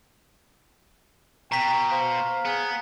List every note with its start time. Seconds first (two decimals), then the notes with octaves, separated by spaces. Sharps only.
1.52 B2 G5 A#5 B6
1.92 C5 F5
2.45 B3 G#4